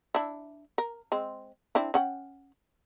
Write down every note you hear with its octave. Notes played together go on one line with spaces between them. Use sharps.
D4 E4
A#4
G#3 C4
C4 D4 E4
C#4 F#5 G5